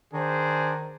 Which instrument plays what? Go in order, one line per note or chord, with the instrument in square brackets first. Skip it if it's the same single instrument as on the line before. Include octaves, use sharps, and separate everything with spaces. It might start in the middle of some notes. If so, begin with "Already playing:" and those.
[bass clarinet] D#3 [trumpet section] D4 G#4 C5